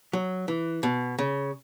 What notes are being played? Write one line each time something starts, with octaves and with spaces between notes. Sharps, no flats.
F#3
E3
B2
C#3